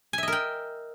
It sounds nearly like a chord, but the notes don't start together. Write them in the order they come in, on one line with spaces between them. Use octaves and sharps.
G#5 E5 D#5 A#4 G5